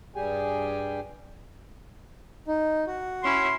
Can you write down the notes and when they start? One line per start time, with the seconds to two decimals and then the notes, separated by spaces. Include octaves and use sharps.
0.16 G2 G3 G4 G#4 G5 G#5
2.47 D#4
2.87 F#4
3.24 C#4 E4 C6